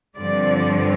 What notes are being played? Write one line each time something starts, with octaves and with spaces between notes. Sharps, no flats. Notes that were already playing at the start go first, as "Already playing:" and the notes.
G2 D3 F3 C4 D5